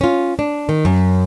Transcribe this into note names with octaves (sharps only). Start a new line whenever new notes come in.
C#4 F4
D4
D#3
F#2